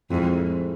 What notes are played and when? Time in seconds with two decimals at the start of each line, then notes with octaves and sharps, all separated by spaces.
0.10 F2 A2 F3 G#3 C4